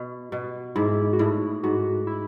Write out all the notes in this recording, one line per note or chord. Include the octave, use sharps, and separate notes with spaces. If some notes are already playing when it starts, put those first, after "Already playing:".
Already playing: B2
B2
G#2 E4
F#4
A2 E4
G#2 F#4
E4